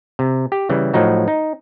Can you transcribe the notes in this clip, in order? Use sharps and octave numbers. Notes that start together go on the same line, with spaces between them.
C3
G4
C#3 E3 G3
A2 F3 F#3 D#4 F#4
D#4